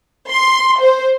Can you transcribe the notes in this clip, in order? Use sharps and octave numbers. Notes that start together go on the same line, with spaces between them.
C6
C5